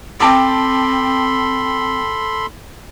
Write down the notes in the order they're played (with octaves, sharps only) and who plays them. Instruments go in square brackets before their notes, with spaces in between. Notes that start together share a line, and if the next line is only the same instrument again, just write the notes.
[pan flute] C4 [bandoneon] A4 B5 C6 [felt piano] G5 A5 D6